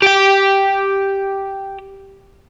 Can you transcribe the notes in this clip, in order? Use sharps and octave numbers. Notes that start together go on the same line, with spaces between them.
G4 G5